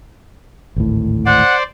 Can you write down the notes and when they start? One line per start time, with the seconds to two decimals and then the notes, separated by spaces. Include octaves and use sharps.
0.76 G#1 D2 A2
1.26 C5 D5 F#5